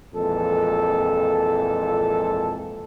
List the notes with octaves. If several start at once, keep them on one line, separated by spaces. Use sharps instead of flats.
F2 A#2 E3 G#3 A4